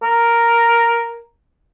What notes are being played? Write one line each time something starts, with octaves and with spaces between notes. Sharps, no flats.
A#4